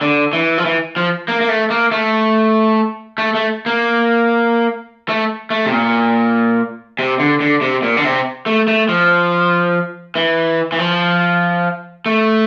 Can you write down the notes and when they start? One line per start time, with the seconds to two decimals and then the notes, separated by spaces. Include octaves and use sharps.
0.01 D3
0.33 E3
0.58 F3
0.65 E3
0.96 F3
1.28 A#3
1.41 A#3
1.49 A3
1.70 A#3
1.92 A3
3.18 A3
3.35 A3
3.66 A#3
5.09 A3
5.50 A3
5.66 C3
5.72 A#2
6.99 C3
7.20 D3
7.40 D3
7.61 C3
7.83 A#2
7.97 D3
8.05 C3
8.46 A3
8.68 A3
8.89 F3
10.16 E3
10.72 E3
10.79 F3
12.06 A3